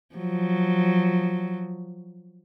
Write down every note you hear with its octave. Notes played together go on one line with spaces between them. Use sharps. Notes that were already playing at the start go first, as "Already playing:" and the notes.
F3 F#3